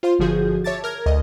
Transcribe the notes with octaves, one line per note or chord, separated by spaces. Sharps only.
F4 C5 F5 C6
G1 D3 F3 F#4 G#4 G6
C#5 E5 A5 D6 A6
A#4 F6 G#6
D2 D#5